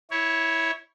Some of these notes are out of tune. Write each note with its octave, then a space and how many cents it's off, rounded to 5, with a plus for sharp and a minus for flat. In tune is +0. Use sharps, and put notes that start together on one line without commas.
E4 -10 C#5 +0